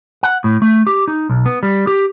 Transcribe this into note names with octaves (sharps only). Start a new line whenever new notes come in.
F#5
A2
A3
G4
D#4
B1
B3
G3
G4